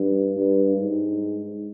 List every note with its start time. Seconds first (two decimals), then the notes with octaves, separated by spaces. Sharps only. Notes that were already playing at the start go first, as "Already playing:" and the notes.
Already playing: G2
0.37 G2
0.77 G#2